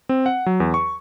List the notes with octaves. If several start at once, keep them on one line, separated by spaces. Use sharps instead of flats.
C4
F#5
F#3
E2
C#6